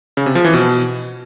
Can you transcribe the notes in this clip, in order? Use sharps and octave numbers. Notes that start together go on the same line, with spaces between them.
C#3
C3
F3
E3
B2